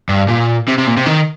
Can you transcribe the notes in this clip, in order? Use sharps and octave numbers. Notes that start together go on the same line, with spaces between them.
G2
A#2
C3
C3
A#2
C3
D#3